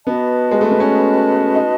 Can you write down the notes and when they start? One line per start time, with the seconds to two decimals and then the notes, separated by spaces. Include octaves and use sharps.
0.06 B3 F#4 B4 D#5 A5
0.51 G#3
0.61 A3
0.71 B3
0.80 C#4
1.55 D#4